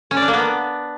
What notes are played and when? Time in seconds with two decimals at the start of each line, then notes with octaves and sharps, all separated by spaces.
0.11 C#4
0.17 D5
0.22 D4
0.28 A#3
0.33 B3